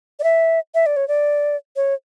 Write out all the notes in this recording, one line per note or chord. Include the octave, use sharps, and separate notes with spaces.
D5
E5
E5
D5
C#5
D5
C#5